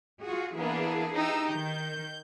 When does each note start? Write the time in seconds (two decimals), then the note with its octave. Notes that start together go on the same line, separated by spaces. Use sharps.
0.21 F4 F#4 G#4
0.55 E3 A#3 B3 D4 E4 G#4
1.16 D#4 G4 E6
1.50 D#3 G6